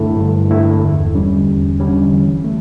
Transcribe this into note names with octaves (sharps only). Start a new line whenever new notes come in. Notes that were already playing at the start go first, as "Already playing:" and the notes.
Already playing: G2 D3 A3 E4 A4
G2
D3 A3 E4 A4
E2
D3 G3 C#4
E2
D3 G3 C#4
E3
A3